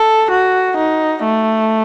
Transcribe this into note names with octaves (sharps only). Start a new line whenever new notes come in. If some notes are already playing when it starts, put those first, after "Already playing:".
Already playing: A4
F#4
D#4
A3